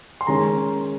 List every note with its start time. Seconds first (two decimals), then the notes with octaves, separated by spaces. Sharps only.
0.21 C6
0.27 D#3 G#3 C#4 A#5